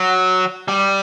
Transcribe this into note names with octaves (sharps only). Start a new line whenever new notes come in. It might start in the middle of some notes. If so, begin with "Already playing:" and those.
Already playing: F#3
G3